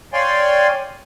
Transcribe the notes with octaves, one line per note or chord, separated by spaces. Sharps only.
C#5 D5 F5 G5 G#5 C6